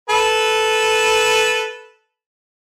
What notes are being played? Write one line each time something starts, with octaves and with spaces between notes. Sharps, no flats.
A4 B4